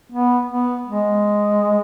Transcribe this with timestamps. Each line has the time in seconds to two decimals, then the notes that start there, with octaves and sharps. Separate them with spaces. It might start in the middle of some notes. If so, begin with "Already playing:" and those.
0.12 B3
0.49 B3
0.86 G#3